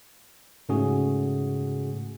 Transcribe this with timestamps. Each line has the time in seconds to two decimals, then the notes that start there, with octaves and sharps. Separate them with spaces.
0.69 G#2 C#3 A3 C#4 F#4 G#4